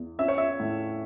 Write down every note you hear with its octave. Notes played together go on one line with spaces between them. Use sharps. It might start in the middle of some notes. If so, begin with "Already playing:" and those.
Already playing: E2
C#4 E5
C#5
E5
A2